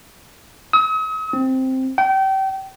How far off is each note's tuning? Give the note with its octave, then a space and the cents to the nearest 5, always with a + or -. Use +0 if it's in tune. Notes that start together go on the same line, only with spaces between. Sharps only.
D#6 +45
C4 +0
G5 -30